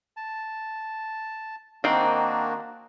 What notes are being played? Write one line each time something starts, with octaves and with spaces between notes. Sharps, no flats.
A5
D#3 A#3 C4 D4 D#4 F#4